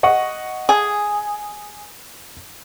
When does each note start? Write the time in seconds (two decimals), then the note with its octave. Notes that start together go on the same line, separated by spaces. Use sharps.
0.03 D#5 F#5 C#6
0.69 G#4